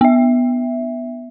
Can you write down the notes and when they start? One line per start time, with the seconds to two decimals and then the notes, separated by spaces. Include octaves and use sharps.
0.01 B3 E5